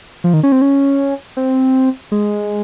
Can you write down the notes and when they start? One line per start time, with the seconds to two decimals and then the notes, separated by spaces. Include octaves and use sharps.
0.24 F3
0.34 D#3
0.43 C#4
0.52 C4
0.62 C#4
1.37 C4
2.12 G#3